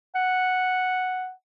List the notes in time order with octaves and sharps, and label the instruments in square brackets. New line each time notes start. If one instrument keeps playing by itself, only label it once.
[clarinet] F#5